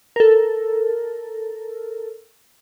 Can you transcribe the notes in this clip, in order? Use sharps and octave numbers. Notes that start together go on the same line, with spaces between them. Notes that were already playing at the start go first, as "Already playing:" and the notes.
A4 A#4